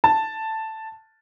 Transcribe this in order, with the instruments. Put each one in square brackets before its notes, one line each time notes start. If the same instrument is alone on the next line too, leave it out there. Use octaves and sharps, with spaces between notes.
[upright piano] A5